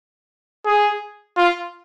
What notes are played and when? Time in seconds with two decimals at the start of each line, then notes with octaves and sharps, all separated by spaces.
0.66 G#4
1.37 F4